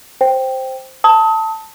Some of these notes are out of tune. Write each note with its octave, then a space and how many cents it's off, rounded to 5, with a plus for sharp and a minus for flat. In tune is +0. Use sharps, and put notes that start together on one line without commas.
C5 +0 G5 +0
A5 +15 D#6 +35